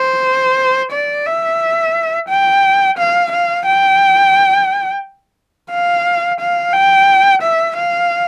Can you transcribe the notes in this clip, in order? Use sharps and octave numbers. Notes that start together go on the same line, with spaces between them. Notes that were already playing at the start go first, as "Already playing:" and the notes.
Already playing: C5
D5
E5
G5
F5
F5
G5
F5
F5
G5
E5
F5